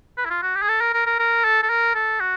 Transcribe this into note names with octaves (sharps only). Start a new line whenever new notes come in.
B4
E4
F4
F#4
G4
G#4
A4
A#4
A#4
A#4
A#4
A4
A4
A#4
A4
F#4